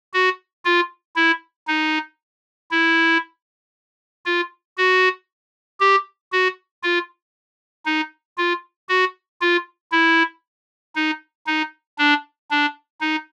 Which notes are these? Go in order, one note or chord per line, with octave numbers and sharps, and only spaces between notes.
F#4
F4
E4
D#4
E4
F4
F#4
G4
F#4
F4
D#4
F4
F#4
F4
E4
D#4
D#4
D4
D4
D#4